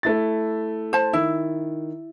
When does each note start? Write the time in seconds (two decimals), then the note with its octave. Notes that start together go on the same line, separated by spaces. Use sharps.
0.03 A3 E4 A6
0.93 C5 A5
1.13 D#3 E4